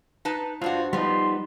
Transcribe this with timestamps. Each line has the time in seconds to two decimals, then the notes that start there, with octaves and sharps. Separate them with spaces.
0.25 D#4 B4 A5
0.61 G2 D4 F4 F#4 C5
0.93 F3 G3 B3 D#4 C6